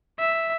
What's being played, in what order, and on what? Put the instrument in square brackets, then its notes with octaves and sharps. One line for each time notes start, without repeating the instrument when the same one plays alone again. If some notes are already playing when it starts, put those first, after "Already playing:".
[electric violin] E5